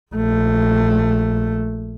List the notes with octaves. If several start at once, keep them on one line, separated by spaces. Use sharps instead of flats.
A#1 A3